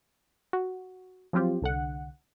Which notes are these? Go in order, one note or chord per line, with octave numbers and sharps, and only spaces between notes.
F#4
F3 F#3 C4 F4 G4
C2 D3 F#5